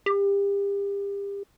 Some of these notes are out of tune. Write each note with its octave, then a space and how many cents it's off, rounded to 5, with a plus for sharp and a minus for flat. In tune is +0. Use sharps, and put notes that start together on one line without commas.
G4 +35